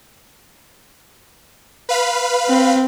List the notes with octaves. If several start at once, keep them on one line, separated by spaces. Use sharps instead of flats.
B4 F5 B5
C4